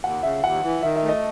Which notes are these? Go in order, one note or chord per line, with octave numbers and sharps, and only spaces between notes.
D#2 F#5
C#3 E5
D#2 F#5
E3
D#3 E5
E5
A3
D#5